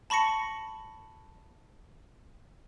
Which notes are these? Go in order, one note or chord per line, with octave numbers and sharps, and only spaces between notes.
A5 B5 C#6 A#6 C#7